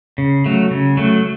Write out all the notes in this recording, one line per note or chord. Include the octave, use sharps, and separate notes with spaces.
C#3
F#3 A3
C#3
F#3 A3